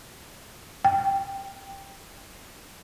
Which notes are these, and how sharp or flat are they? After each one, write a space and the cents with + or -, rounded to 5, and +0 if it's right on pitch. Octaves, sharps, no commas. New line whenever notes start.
G5 +5